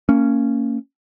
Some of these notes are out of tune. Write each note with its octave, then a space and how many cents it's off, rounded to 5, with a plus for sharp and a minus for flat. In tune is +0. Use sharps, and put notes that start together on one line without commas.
A#3 -25 C#4 +0